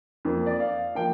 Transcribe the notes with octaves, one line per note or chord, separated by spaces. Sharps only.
F2 F3 A#3
D5
F5
F3 A#3 G5